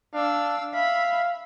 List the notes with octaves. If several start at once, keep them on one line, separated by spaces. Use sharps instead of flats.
D4 F5 E6
E5 F5 B5